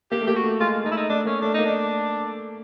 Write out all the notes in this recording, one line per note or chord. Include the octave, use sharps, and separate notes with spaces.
A#3 G4
A3
A#3 G4
F#4
A3
G#3 F4
A3 D#4
E4
D#4
A3 D4
A#3 C#4
A3 D4
A#3 D#4
D4